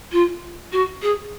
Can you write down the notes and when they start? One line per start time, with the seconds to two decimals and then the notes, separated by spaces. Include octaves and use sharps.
0.12 F4
0.72 F#4
1.02 G#4